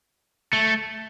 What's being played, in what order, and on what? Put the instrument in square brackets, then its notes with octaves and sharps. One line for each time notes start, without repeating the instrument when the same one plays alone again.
[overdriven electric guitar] A3